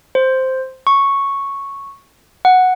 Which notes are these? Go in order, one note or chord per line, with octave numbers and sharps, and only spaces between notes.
C5
C#6
F#5